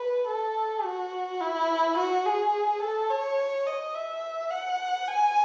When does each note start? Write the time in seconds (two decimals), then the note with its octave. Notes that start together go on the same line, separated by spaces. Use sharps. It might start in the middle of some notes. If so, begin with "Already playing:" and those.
Already playing: B4
0.28 A4
0.84 F#4
1.41 E4
1.97 F#4
2.26 G#4
2.82 A4
3.10 C#5
3.67 D#5
3.95 E5
4.51 F#5
5.08 G#5